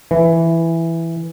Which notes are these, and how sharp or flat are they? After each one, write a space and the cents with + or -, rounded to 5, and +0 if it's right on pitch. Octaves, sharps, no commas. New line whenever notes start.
E3 +5